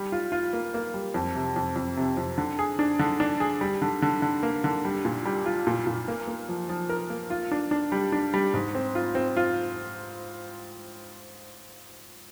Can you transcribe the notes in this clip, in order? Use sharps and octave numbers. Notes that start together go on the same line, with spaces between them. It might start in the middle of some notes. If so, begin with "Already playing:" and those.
Already playing: G3
F4
F4
A#3
A#3
G3
F2
C3
F2
F2
C3
F2
D3
G#4
D4
D3
D4
G#4
G3
D3
D3
D3
A#3
D3
G3
A#2
G3
F4
A#2
A#2
A#3
A#3
F3
F3
A#4
A#3
F4
D4
D4
G3
D4
G3
G#2
C4
F4
C4
F4